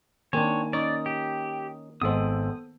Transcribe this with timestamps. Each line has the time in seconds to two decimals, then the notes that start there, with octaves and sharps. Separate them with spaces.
0.33 D#3 A#3 C4 D4 A#4 C#5 G#5
0.73 C#4 D#4 C#5 D5 D#6
1.06 G4
2.02 G#1 G#3 B3 A4 C5 D#6